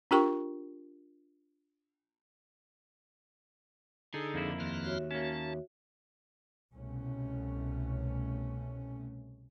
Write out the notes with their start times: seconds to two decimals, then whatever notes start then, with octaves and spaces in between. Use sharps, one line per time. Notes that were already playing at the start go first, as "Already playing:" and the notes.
0.11 D4 F4 G4 A#4 G5 C#6
4.14 D3 D#4 G#4 A4
4.34 F2 A#3 E4
4.60 D#2 C6 F6 F#6
4.85 F#4 C#5 E5
5.11 A#3 C#4 A5
6.74 C2 B2 A3 C#4